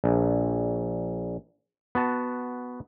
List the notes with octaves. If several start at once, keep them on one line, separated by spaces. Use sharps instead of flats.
A#1
B3 F#4 A5